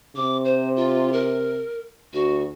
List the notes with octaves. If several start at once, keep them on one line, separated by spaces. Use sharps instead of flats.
C3 D6
C5
F4
A#4
D2 F#4